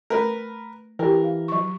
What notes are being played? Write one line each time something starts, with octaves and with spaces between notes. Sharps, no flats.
A3 A#4 B4
E3 G4 A#4 G5
F5
F#3 C#6